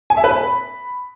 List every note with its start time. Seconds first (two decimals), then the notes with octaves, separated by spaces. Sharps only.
0.10 G#5
0.17 E5
0.24 B4
0.31 B5